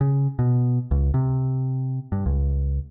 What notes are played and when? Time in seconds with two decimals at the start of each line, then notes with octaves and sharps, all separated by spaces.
0.01 C#3
0.39 B2
0.91 C#2
1.14 C3
2.12 G2
2.26 C#2